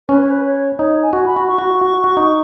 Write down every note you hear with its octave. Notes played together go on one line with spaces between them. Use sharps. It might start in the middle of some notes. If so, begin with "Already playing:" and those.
C#4 B4
C#5
B4
C#5
D#4 C#5
G#5
F#4
B5
F#4
C#6
F#4
F#4
F#4
D#4